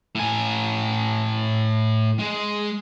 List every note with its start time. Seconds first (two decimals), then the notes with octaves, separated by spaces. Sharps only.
0.15 A2 G#5
2.19 G#3